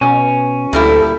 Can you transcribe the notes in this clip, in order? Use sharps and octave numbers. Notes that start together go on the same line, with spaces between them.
B2 C#4
D2 A#2 G3 E4 A4